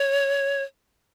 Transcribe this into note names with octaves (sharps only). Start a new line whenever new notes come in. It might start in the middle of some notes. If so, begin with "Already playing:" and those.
Already playing: C#5